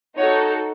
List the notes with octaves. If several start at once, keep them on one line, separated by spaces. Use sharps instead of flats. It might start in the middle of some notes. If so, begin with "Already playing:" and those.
D#4 F#4 A4 C#5